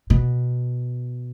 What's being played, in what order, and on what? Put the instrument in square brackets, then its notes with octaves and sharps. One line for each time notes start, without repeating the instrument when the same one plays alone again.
[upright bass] B2